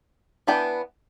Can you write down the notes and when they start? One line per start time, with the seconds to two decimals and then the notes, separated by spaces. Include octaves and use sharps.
0.47 E3 B3 D4 G5